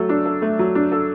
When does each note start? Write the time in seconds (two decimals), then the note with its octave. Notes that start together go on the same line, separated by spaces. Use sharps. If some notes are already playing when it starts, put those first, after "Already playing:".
Already playing: F#3 A3 A4
0.09 D4
0.26 A4
0.42 A3
0.59 F#3
0.75 D4
0.92 A4